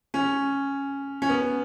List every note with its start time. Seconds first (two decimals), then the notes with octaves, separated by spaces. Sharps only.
0.14 C#4
1.22 C#4
1.29 B3